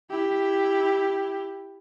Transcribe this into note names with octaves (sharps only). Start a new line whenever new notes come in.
E4 G4